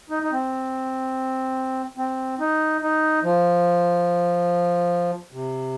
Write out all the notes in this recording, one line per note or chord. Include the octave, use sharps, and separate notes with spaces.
D#4
D#4
C4
C4
D#4
D#4
F3
C3